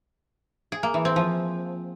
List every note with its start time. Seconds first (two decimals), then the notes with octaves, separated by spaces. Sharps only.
0.72 G#4
0.83 A#3
0.94 E3
1.05 C4
1.16 F3